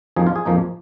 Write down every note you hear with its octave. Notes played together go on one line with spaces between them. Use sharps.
F2 F3 A#3 D#4 G#4
F4
G#4
F2 F3 A#3 D#4